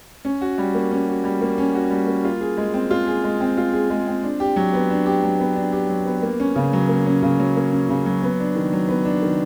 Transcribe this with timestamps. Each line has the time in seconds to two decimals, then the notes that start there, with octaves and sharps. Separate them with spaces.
0.25 C#4
0.41 F#4
0.58 G3
0.74 A#3
0.91 C#4
1.08 F#4
1.24 G3
1.41 A#3
1.58 C#4
1.75 F#4
1.90 G3
2.07 A#3
2.25 F4
2.41 G#4
2.58 G#3
2.74 C4
2.90 F4
3.07 G#4
3.24 G#3
3.40 C4
3.57 F4
3.73 G#4
3.90 G#3
4.07 C4
4.23 D4
4.40 G4
4.56 F#3
4.73 B3
4.90 D4
5.06 G4
5.23 F#3
5.40 B3
5.56 D4
5.72 G4
5.89 F#3
6.06 B3
6.22 A#3
6.40 C#4
6.56 C#3
6.73 F#3
6.89 A#3
7.06 C#4
7.22 C#3
7.39 F#3
7.56 A#3
7.73 C#4
7.89 C#3
8.06 F#3
8.22 B3
8.39 D4
8.56 D#3
8.73 F#3
8.89 B3
9.05 D4
9.22 D#3